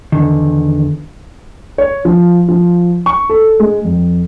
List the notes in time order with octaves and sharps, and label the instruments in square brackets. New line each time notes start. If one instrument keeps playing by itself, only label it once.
[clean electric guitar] E2 D3 D#3
[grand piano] C#5
F3
F3
C#6
A4
G#3
F2